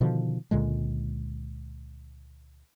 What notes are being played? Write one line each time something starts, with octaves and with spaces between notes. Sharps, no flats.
B2 D3 D#3 F3
C#2 A#2 D3 G#3